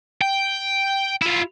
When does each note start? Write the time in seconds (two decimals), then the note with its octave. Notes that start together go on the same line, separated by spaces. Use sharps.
0.22 G5
1.22 E4 F4